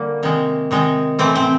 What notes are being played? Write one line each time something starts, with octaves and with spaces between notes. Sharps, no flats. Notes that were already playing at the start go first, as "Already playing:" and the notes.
Already playing: D3 G3 A#3
C3 D#3 G#3
C3 D#3 G#3
A2 E3 A3 C4
C4